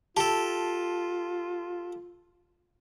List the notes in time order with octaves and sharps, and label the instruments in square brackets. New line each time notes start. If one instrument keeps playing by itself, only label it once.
[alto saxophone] F4 [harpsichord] G4 A4 [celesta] A5